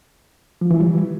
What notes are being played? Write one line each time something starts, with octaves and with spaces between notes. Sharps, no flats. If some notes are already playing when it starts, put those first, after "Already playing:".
F3
E3
G3